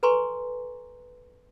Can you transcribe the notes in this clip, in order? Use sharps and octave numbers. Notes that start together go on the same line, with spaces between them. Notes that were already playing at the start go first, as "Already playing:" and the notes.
A4 B4 G#5 A#5 C6 C#6